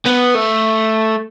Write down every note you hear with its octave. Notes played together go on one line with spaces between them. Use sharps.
B3
A3